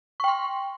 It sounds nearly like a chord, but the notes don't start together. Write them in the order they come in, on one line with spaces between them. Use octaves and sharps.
C#6 G5 C6